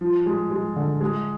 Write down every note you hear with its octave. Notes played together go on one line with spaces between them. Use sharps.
F3
G#3
G#3
D3
G#3